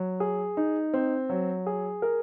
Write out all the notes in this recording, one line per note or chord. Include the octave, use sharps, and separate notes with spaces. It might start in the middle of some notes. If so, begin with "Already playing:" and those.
Already playing: F#3
G#4
D#4
C4
F#3
G#4
A#4